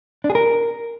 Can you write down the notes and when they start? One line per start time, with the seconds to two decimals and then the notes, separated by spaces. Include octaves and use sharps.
0.24 D4
0.30 G#4
0.35 A#4